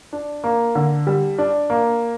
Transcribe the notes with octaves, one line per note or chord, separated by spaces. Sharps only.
D4
A#3
D3
G3
D4
A#3